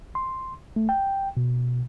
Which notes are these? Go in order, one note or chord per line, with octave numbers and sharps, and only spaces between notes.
C6
A3
G5
B2